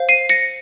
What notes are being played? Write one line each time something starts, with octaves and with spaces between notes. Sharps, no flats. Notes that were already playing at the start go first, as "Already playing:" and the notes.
Already playing: C5 F5
C7 D#7
A#6 C#7